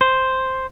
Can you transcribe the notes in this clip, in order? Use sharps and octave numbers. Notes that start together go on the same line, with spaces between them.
C5